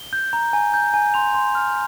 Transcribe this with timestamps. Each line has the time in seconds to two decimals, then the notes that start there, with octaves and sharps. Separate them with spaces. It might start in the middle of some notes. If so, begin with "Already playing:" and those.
Already playing: G7
0.13 G6
0.33 A#5
0.53 G#5
0.74 G6
0.94 G#5
1.14 C6 F7
1.35 C6
1.55 F6